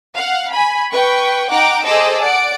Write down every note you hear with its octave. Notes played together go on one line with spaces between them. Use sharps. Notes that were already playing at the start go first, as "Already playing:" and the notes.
F5 F#5
G#5 B5
B4 G5 C#6
D#4 F#5 G5 A#5 D6 D7
G#4 A4 C5 D#5 D6 E6
D5 F#5 D7